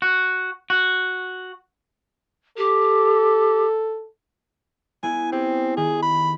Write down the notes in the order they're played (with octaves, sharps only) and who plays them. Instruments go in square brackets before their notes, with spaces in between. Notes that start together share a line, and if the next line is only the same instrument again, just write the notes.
[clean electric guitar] F#4
F#4
[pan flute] G4 [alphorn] A4
[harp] B3 E4 G#4 [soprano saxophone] G#5
[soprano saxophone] C4 [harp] G4 G#4
[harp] D#3 [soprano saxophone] G#4
[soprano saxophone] B5